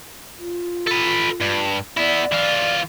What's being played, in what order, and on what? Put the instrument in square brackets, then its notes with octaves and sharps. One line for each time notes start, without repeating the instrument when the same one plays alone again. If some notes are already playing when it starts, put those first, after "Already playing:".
[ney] F4
[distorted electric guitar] A4 B4
G2
[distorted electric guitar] B3 E4 [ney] D5
[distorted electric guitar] E3 F4